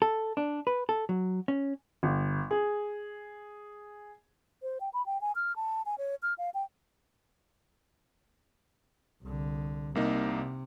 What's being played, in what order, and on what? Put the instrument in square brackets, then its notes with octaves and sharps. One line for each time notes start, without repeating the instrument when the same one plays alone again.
[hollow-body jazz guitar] A4
D4
B4
A4
F#3
C#4
[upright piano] G1
G#4
[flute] C5
G5
B5
G5
G#5
F6
A5
G#5
C#5
F6
F5
G5
[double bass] C2 D3
[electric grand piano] C2 A#3 D#4 [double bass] C3